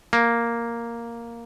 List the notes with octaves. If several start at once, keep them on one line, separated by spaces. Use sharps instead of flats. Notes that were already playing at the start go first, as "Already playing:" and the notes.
A#3